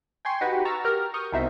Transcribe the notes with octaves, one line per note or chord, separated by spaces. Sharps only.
G5 G#5 C6 C#6
D#4 F#4 G4 B4
A#5 C#6 E6 F6 A6
G4 A#4 A#5 F6
C#6 D#6 F6 G6
C2 B2 D#4 C5 E5